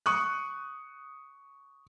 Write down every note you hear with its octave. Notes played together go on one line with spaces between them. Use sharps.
C#6 D#6 F#6